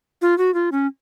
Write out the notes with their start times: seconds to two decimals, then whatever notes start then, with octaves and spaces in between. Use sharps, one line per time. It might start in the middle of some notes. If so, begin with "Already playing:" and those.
0.22 F4
0.38 F#4
0.54 F4
0.72 C#4